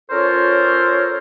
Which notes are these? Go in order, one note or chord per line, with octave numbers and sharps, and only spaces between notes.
C#4 F4 A4 A#4 C5 C#5